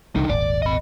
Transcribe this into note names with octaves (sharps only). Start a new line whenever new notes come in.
C2 D3 D#4
D#1 G#1 D5
D#5 B5